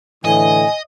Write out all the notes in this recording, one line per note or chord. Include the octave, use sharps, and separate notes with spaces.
A2 D3 E3 D#5 G#5